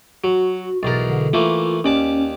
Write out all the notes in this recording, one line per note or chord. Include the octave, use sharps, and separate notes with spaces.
F#3 F#4
B1 E2 A#4 A6
D3
E3 A3 A#3 F4
D#2 C#4 D5 A5